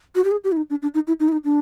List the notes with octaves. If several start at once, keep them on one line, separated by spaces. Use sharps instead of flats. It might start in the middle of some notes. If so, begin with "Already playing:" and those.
F#4
G4
G#4
G4
E4
D#4
D4
D4
D#4
E4
D#4
E4
D#4
D4